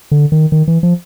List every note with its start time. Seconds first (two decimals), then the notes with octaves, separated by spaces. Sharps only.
0.11 D3
0.32 D#3
0.52 D#3
0.68 E3
0.83 F3